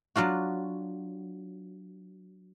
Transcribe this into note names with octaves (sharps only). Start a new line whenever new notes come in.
F#3 D4 F4 F#4